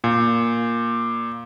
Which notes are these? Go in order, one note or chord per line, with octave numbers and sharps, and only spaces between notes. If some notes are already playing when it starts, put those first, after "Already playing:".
A#2